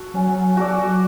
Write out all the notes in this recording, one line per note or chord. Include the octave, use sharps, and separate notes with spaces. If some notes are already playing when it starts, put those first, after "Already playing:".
Already playing: F#4 A4
F#3 C#4
F#4 A4 D5